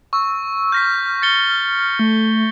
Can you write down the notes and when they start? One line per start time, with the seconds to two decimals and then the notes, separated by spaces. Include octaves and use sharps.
0.13 C#6 E6
0.72 F6 G6 A#6 B6
1.22 A6 C#7 G7
1.99 A3